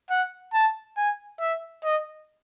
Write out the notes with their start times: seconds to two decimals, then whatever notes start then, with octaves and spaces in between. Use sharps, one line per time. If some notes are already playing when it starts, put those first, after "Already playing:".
0.10 F#5
0.54 A5
0.97 G#5
1.40 E5
1.84 D#5